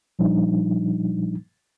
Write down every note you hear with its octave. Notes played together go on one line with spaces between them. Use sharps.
A#2 F3 G3 D4 D#4